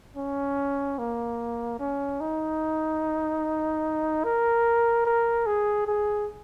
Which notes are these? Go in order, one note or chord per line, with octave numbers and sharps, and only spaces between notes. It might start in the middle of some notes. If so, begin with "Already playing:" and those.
C#4
A#3
C#4
D#4
A#4
A#4
G#4
G#4